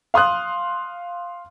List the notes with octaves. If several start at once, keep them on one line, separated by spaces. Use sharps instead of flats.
F5 C6 D#6 F#6